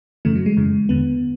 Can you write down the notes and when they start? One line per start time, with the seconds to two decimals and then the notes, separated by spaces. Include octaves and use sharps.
0.25 F#2 C#3 E3 A3
0.35 F#3
0.46 G#3
0.57 F#2 C#3 E3
0.89 E2 D3 B3